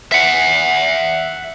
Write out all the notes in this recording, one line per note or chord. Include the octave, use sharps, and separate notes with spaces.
E5 F#5